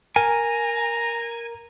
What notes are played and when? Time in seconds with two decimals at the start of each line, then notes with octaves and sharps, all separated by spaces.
0.16 A#4 G#5 A#5